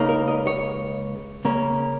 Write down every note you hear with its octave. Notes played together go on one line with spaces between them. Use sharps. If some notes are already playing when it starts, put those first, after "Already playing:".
Already playing: C#2 C#3 A#3 D#4
A#4
D#5
C#5
C#3 A#3 C#4